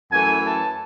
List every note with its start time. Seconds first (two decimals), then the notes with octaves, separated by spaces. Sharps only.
0.11 F#2 E3 A3 G#5
0.45 A5